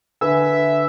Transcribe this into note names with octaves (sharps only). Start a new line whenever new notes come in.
D3 B4 E5 G#5